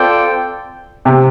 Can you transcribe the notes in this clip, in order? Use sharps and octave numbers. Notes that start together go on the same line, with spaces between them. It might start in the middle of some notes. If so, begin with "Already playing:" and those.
Already playing: C4 F4 A4 D5 G5
C3